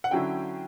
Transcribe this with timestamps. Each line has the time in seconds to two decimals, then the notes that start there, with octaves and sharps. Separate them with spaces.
0.04 F#5
0.11 D3 F#3 C#4 E4 G5